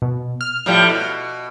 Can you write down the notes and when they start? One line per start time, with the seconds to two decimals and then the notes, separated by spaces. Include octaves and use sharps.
0.02 B2
0.41 F6
0.66 A2 F3 G3
0.89 B2